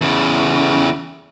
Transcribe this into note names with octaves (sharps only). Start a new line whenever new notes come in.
E2 C#3